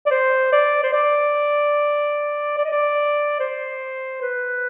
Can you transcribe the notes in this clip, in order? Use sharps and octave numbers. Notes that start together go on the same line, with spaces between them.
D5
C5
D5
C5
D5
D5
D#5
D5
C5
B4